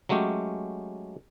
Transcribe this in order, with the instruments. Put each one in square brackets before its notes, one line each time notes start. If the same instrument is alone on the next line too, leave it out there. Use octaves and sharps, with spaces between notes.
[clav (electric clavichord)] F#3 G#3 A3 C#4 G4